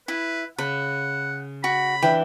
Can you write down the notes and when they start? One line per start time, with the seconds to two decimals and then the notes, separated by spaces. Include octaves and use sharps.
0.08 E4 B4
0.58 C#3 F#5 B5
1.64 F#4 B5
2.02 E3 D4 E4 G5